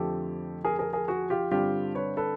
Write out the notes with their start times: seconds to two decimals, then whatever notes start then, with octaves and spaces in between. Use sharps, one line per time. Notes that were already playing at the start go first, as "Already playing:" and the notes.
Already playing: F2 D3 F3 A3 C4 G4 A4
0.64 G#4 A#4
0.79 G#4 A#4
0.93 G#4 A#4
1.08 F#4 G#4
1.30 F4 G4
1.51 G2 D3 G3 C4 F4 G4
1.95 B4 C#5
2.17 A4 B4